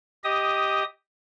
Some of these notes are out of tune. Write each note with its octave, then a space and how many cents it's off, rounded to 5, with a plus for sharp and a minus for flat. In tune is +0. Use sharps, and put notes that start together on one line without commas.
G4 +0 D#5 +10 D#6 +0